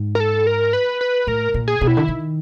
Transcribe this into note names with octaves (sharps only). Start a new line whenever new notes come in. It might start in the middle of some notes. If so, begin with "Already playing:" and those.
Already playing: G#2
A#4
A4
A#4
B4
B4
A2 A#4
A#2
G#4
B2
E4
D3
D#3